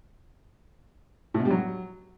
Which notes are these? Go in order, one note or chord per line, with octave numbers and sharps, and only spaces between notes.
A2
B2
G3
F#3